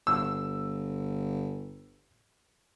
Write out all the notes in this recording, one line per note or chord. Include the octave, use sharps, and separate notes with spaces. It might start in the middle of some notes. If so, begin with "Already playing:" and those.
G1 E6